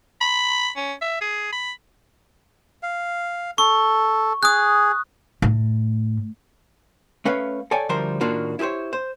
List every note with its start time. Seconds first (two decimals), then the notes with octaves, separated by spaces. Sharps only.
0.21 B5
0.76 C#4
1.01 E5
1.21 G#4
1.52 B5
2.83 F5
3.58 A4 C#6
4.43 G#4 D#6 F#6
5.42 A2
7.25 A3 C#4 B4 C#5 F5
7.71 A4 C#5 D5 G5 G#5
7.89 D2 F3 G3 A#4 C5 C6
8.21 A2 D#3 A#3 D4 F4 F#4
8.59 E4 G4 G#4 C5 C#5
8.93 C5